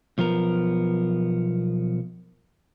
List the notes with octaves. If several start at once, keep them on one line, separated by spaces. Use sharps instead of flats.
B1 F3 B3 A#4